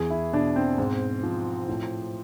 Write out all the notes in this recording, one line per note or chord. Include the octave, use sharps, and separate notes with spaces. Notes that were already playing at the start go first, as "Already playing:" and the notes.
Already playing: E2 E3 G#4
E4
B2 D4
C4
G#2
F3
A2